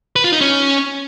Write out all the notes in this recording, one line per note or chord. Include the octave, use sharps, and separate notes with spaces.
B4
F4
D#4
C#4